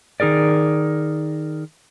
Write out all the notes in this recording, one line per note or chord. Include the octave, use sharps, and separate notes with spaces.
D#3 D#4 G#4 A#4 D5